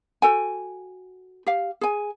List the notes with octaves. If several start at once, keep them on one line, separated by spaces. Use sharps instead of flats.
F#4 A4 G5 G#5
G4 F5
G#4 G#5